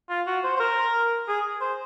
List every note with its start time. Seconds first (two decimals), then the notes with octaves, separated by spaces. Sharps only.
0.10 F4
0.27 F#4
0.44 C5
0.56 C5
0.60 A#4
1.28 G#4
1.61 C5